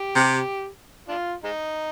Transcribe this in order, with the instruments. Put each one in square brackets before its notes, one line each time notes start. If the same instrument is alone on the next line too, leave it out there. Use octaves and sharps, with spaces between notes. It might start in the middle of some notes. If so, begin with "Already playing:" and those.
Already playing: [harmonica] G4
[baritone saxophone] C3
[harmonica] D4 F4
G#3 D#4